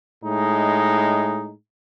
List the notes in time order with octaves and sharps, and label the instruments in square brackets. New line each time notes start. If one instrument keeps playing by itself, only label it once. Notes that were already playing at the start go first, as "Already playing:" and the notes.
[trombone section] A2 G#3 D#4